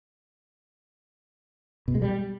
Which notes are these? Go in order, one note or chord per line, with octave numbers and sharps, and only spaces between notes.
B2
G#3
G3